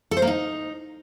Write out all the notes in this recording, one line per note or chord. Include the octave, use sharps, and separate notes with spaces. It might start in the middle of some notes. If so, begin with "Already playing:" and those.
A4
C5
A#3
D#4